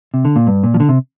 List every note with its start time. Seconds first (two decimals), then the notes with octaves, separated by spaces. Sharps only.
0.14 C3
0.25 D3
0.36 A#2
0.47 G2
0.63 A#2
0.74 F3
0.80 D3
0.89 C3